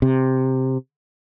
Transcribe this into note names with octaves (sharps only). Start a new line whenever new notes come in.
C3